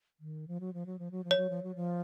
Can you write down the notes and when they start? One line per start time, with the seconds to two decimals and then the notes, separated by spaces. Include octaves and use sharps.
0.20 D#3
0.48 F3
0.60 F#3
0.74 F3
0.86 F#3
0.99 F3
1.11 F#3
1.24 F3
1.31 C#5
1.37 F#3
1.50 F3
1.63 F#3
1.75 F3